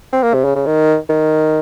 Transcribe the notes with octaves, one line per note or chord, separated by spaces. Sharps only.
C4
A#3
C3
C#3
C#3
D#3
D#3